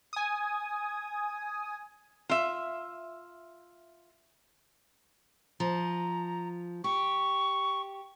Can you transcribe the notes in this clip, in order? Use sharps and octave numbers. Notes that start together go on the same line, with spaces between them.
G#5 D#6
F4 E5
F3 A#5
G4 C#6